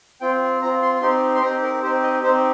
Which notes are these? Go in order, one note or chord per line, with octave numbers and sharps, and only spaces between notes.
C4 F4 G5
C4 F4 A#5
C6
C4 D#4 G4 C6
C6
C4 D#4 G4 A#5
A#4
C4 D#4 G4 C5
D#5
C4 D#4 G4 C5